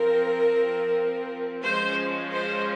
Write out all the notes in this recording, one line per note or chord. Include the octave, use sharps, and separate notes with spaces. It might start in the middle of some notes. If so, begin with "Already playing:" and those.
Already playing: F3 C4 A#4
F3 G#3 C#4 C5
C5